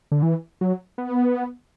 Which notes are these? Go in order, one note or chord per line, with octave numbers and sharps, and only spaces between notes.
D3
E3
F#3
B3